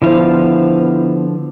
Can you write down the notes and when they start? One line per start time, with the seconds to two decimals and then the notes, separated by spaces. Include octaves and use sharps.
0.02 D3 F3 B3 E4 C5 F5